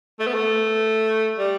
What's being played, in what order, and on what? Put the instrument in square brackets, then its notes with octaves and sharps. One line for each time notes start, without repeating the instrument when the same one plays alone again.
[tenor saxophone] A3
B3
A3
G3